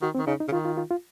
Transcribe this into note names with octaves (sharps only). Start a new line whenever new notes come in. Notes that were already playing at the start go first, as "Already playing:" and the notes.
D#3 F#4
C4
D#3
C#3 D#4
D#4
C#3
D#3 F4
F4
F4
F4